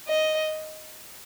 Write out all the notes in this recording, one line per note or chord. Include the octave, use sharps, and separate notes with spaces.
D#5